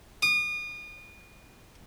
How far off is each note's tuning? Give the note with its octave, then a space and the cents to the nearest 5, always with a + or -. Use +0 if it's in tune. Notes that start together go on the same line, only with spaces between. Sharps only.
D#6 -35